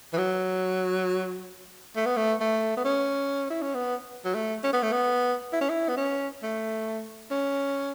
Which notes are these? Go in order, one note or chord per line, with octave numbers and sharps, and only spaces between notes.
E3
F#3
A3
B3
A3
A3
B3
C#4
E4
C#4
B3
F#3
A3
C#4
B3
A3
B3
E4
C#4
E4
B3
C#4
A3
C#4